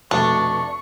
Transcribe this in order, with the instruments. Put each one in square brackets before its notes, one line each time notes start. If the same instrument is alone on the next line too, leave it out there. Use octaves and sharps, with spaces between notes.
[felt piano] F1 B2 A3 [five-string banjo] D4 [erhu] C#6